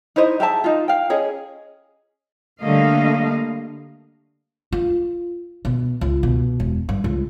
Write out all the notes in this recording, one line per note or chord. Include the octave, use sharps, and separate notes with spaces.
D#4 E4 C5 D#5
G4 G#4 E5 A5
D#4 F4
F5 G5
C#4 G#4 D#5
D3 G3 A3 A#3 D#5 F5
F4
B2
C#2
B2
E1
G2
C#2